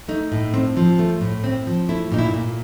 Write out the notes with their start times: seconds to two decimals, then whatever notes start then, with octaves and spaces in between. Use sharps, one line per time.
0.08 A3 D#4
0.32 A2
0.54 C4
0.77 F3
0.99 A3
1.21 A2
1.44 C4
1.67 F3
1.89 A3 E4
2.12 A#2 D#4
2.18 E4
2.34 A#2